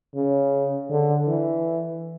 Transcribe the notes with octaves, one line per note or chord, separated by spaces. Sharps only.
C#3
D3
E3